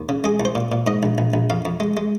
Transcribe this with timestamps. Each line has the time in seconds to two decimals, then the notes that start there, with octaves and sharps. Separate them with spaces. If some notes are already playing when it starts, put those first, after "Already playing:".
Already playing: D#2
0.09 C#3
0.24 G#3 G#4
0.40 C2
0.45 C5
0.55 A#2
0.72 A#2
0.87 G#2 D#5
1.03 A#1
1.18 A#1
1.34 A#1
1.50 F2 F5
1.65 F2
1.80 G#3
1.97 G#3